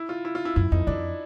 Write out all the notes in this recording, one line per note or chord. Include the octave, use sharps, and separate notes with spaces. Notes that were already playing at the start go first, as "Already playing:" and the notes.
Already playing: E4
F4
E4
F4
E4
F#2 E4
F2 D#4
F2 D4